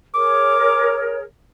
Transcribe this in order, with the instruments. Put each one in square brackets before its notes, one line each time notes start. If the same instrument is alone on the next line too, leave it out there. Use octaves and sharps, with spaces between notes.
[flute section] G#4 A#4 C#5 [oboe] D6